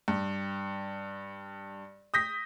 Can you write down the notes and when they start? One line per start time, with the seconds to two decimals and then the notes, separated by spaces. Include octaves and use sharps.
0.08 G2
2.14 D#6 G6 A#6 B6